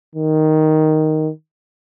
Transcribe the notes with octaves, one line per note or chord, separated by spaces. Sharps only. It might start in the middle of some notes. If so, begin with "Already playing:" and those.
D#3